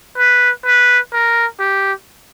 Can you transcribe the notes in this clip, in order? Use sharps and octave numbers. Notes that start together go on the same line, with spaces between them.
B4
B4
A#4
G4